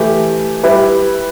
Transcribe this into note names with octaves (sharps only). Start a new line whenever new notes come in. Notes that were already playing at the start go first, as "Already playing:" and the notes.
Already playing: E3 A3 G4
G3 E4 G4 B4